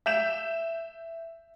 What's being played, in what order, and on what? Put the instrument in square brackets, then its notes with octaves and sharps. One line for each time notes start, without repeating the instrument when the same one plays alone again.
[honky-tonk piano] E5 G6 E7